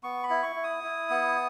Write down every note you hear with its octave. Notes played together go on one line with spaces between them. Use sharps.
B3 C#6
B5
E4
C#6
E4
D#6
E4
B3